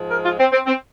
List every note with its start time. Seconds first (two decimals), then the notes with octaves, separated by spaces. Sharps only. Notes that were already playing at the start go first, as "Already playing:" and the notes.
Already playing: G#2 F3 G#3
0.11 A#4
0.24 F4
0.39 C4
0.52 C4
0.66 C4